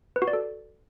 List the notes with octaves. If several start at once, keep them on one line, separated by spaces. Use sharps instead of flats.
B4
F#4
D5
A4